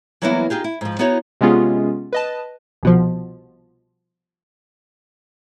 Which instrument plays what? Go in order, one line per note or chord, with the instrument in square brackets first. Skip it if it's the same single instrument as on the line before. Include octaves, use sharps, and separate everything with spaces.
[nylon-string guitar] E3 F#3 G3 A#3 B3 E4
D#4 F4 G4 G#4
E4
G#2 F3
B3 D#4 E4 F#4 C#5
[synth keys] C3 G#3 B3 C#4 F4 G#4
B4 D#5 A5
[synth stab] C2 B2 F3